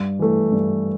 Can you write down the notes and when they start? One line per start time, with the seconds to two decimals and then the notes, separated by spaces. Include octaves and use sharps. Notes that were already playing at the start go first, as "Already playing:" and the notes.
Already playing: G2
0.19 E3 A3
0.52 G2